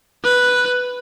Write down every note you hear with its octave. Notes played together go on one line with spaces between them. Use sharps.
B4